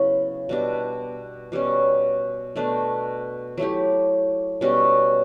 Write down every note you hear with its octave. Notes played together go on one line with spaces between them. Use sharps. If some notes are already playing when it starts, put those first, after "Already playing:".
Already playing: C#3 F#3 B3 E4
B2 G3 D4
B2 G3 C#4
B2 A3 D4
F#3 A3 E4 G4
B2 G3 C#4 F#4